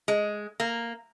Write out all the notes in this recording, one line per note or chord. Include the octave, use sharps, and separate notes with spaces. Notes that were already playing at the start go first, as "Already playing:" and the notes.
G#3
A#3